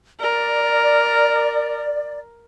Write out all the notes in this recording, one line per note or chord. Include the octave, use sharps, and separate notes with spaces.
A#4 D5